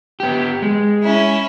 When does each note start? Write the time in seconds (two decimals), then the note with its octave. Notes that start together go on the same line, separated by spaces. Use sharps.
0.20 B3 G4
0.62 G#3
1.03 C#4 E4